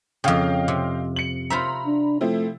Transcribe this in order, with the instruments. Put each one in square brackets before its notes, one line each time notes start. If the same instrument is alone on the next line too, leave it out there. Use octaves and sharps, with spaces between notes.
[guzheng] F2 C#3 [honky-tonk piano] D#5 F5 G5
[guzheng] C3
[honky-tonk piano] C#7 F#7
[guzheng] F4 C5 E5 [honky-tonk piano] A#5 B5
[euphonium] D4
[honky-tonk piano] F3 C4 E4 [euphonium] A3